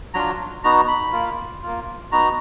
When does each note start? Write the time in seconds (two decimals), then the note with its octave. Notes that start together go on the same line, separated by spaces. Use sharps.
0.14 F#3 D4 F4 A#5
0.64 B3 D#4 F#4 A#5
0.88 B5
1.12 A#3 F4
1.62 A#3 F4
2.12 B3 D#4 F#4 A#5